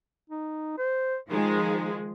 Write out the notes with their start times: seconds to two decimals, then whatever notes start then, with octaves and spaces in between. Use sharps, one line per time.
0.30 D#4
0.78 C5
1.29 D#3 F3 G#3 D#4